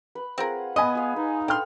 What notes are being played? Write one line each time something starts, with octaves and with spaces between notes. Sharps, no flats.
B4
C4 F4 G#4 A#4 F#5
B3 D#5 G#5 B5 D#6
F4 F5
D#4 B4
D4 A4 G5 C6 F6